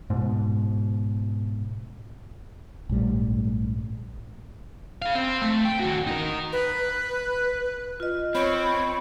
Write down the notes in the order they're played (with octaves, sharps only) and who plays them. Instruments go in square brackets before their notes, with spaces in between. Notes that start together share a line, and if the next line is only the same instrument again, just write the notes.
[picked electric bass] G#2 B2
[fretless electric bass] A#1 G#2 G3 A3
[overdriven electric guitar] G#4 F5
C4
A3
G5
D#2 F#4
D#4 A#4
[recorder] B4
[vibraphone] F4 D#5
[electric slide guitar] C4 [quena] C#5 [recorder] B5